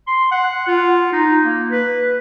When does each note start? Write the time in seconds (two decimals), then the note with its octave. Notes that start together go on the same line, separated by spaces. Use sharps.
0.07 C6
0.32 F#5
0.67 F4
1.13 D#4
1.45 A#3
1.70 B4